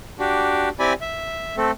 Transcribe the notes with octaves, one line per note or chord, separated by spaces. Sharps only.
D4 F#4 G4
C4 E4 G4 D5 G#5 B5
E5
A3 C4 A4